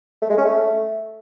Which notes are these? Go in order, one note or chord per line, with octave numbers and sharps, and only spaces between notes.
A3
G#3
C#4
A3